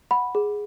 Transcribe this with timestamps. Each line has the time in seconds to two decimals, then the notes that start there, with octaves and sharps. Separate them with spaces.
0.11 F#5 B5
0.35 G#4